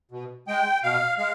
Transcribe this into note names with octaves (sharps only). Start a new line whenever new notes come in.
B2
G#3 G5
B2 F5
G#3 F5